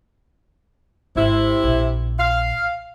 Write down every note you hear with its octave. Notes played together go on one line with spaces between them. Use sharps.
G#1 C3 E4
A#1
F5